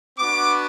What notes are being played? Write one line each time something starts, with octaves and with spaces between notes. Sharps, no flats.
B3 D4 F#4 D6